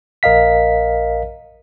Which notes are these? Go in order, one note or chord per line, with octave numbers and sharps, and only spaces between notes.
A#1 A#4 D#5 F5 B6